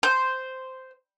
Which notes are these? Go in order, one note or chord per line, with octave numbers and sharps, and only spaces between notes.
C5